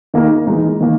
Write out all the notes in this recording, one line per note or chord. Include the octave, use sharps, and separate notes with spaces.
D#3 A#3 D#4 A#4
E3 G#3 D#4
D#3 A#3